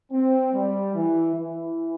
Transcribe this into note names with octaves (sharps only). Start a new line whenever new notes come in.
C4
G3
E3
E3